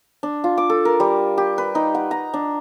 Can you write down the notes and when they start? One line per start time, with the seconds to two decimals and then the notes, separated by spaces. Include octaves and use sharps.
0.23 D4
0.44 F4
0.58 D6
0.70 A4
0.85 A#4
1.00 G3
1.38 G4
1.58 B4
1.75 D#4
1.95 F#5
2.11 A#5
2.34 D4